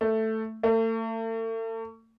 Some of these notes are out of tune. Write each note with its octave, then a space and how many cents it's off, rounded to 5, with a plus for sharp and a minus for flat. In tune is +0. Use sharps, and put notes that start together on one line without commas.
A3 +5
A3 +40